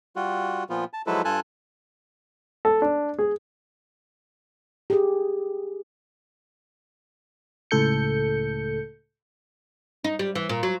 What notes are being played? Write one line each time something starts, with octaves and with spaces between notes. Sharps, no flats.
G3 F4 F#4
A#2 F3 B3 F4
A5
F3 F#3 G#3 E4 A4 B4
G2 F4 A4 G#5 A5 F#6
A4
D4
G#4
G4 G#4
C#2 A2 A4 G6 C#7
D#4
G3
E3
A#2
F#3